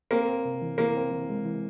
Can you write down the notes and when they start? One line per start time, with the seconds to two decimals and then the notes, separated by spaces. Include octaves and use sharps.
0.11 A#3 C4
0.28 C4
0.45 C3
0.62 E3
0.78 E3 A#3
0.96 C4
1.12 E3
1.29 G#3
1.45 E3